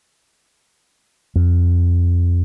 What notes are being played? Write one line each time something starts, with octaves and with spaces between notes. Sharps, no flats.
F2